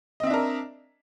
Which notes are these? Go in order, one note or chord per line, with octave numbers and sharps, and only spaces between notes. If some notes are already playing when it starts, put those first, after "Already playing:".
C4 D4 A#4 D#5 E5